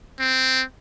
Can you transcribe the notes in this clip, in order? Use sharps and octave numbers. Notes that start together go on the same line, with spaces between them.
C4